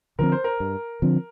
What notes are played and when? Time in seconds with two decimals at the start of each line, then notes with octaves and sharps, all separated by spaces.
0.19 D3 F3 C4 A#4
0.32 C5
0.44 A#4
0.60 G2
1.02 D3 F3 C4